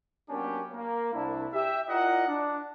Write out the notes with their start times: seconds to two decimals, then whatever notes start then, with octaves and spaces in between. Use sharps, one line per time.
0.30 F#3 A#3 B3 C#4 D4 G4
0.73 A#3
1.14 C2 D4 E4
1.53 G4 E5
1.89 E4 F4 A#4 D5 D#5 F#5
2.28 D4